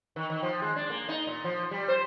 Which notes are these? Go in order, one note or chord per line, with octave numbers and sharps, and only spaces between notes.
D#3
D#3
F3
G#3
D4
A#3
D#4
A#2
F3
G3
C5